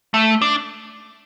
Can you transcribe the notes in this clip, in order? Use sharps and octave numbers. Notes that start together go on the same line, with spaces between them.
A3
D4